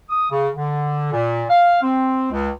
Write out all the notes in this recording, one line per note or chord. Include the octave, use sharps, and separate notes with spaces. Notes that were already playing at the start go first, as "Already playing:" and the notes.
D#6
C#3
D3
A#2
F5
C4
C#2